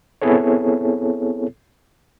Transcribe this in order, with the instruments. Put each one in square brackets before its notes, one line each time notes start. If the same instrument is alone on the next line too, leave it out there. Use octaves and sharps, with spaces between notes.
[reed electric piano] B3 C4 E4 G#4 A4 C#5